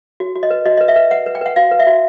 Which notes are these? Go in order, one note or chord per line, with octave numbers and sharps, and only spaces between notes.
F#4
F#4
D#5
B4
F#4 D#5
B4 D#5
E5
B4
B4 F#5
B4
G5
B4 F#5
F#4 F5
B4
E5
F#4